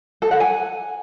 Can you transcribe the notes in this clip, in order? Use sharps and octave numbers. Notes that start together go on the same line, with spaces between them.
A4
F#5
G#5